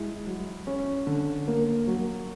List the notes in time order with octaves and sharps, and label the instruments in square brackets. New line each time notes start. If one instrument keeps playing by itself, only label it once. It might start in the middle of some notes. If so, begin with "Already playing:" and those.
Already playing: [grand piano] G#3 E4
F#3
C#4
D3
A#3
F#3